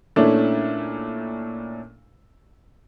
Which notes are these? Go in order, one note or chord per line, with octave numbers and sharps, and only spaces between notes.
A#2 A3 C#4 D4 E4